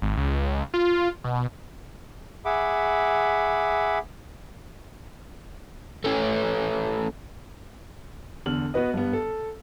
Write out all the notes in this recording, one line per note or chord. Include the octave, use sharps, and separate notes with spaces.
G#1
C#2
F4
B2
G#4 E5 F#5 B5 D6
A3 C#4
E2 D3 F6 F#7
B3 F#4 B4 D#5
G2 B3
A4